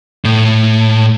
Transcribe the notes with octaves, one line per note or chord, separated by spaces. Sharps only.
A2